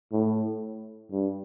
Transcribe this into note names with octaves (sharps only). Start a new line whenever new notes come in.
A2
G2